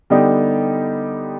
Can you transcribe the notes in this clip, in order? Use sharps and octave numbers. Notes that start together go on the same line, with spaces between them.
D3 G3 B3 D#4 G4